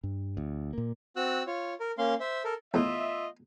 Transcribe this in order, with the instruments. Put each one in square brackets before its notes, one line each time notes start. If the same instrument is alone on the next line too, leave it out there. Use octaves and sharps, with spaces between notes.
[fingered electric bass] G2
D2
A#2 A#3
[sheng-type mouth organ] C4 F#4 E6 F#6
F4 C#5
A#4
A#3 C#4 F5 C6
C5 E5
A4 A#4
[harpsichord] E2 A2 E3 [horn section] F4 D#5 E5